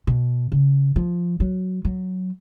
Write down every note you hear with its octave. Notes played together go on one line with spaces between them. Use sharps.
B2
C#3
F3
F#3
F#3